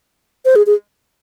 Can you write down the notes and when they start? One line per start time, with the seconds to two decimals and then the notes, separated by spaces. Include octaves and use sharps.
0.45 C5
0.56 G#4
0.66 G#4